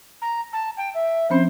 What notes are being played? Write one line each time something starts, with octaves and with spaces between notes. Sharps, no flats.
A#5
A5
G5
E5
F3 C4 C#4 C5